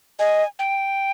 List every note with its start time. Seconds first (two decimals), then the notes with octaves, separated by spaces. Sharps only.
0.19 D#5 G#5
0.59 G5